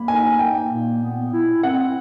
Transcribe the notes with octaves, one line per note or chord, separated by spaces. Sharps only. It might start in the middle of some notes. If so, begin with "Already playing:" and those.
Already playing: A#3 B5
D#4 G#5
A#3 G5
A#2
B3
E4
C4 F#5